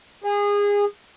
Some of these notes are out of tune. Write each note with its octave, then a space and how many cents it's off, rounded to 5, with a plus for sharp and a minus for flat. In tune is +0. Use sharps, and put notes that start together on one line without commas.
G#4 -25